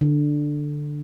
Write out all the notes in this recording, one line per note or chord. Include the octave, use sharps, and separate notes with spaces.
D3